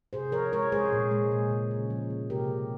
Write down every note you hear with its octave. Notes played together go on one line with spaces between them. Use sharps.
C3 G#4 C5
F3 A#4 C#5
G#3 A#4 C#5
G#3 G#4 C5
A#2
G#3
A#2
C#3
C#3
F3
A#3
C3 G4 A#4
C3